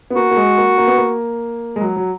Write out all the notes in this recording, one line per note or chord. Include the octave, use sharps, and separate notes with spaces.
B3
A#3 F#4
A#3
G#3
A#3
A#3
B3
A#3
G#3
F#3
F#3